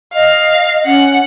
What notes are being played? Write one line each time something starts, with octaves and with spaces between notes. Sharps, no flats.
D#5 F5
C#4 F#5